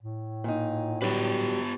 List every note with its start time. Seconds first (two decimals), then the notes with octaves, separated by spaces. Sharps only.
0.03 A2
0.44 A#2 D#4
1.02 F#3 G3 B3 D4 G4 B4